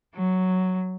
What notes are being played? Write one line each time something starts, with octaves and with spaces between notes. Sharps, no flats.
F#3